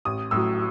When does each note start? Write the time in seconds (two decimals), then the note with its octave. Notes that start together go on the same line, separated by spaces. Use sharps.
0.05 A1 D#6
0.31 A2 F#3 E6